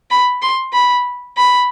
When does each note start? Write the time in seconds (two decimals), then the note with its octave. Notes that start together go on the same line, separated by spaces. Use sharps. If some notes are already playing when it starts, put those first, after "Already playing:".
0.11 B5
0.42 C6
0.73 B5
1.37 B5